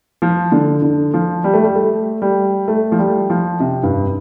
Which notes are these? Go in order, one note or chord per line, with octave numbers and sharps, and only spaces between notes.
F3
D3
D3
F3
G3
A3
G3
A3
G3
A3
F3
G3
F3
C3
G2